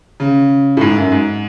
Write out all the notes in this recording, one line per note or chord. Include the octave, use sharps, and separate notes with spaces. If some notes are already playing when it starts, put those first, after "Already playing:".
C#3
A2
G#2
F#2
G#2